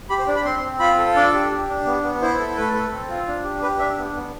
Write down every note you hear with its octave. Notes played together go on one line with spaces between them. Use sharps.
G4 B5
C5
D4 D5
B5
C4 C6
C4
F4 B5
A4
D4 D5
G4
G4
D4
B3
B3
E4 C5
A4
A3 B4
A4
C4
F4
D4
G4
G4 B4
D4 E5
B3
B3